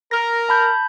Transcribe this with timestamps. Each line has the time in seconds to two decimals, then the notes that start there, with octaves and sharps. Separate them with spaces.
0.11 A#4 A#6
0.49 A5 B5 G6